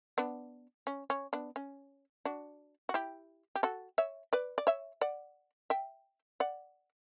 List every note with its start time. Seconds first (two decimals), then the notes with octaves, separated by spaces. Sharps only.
0.18 B3 D4
0.87 C#4
1.10 C#4
1.33 B3 D4
1.56 C#4
2.25 D4 F#4
2.89 F#4
2.94 E4 G4
3.55 G4
3.63 F#4 A4
3.98 C#5 E5
4.33 B4 D5
4.58 D5
4.67 C#5 E5
5.01 D5 F#5
5.70 E5 G5
6.40 D5 F#5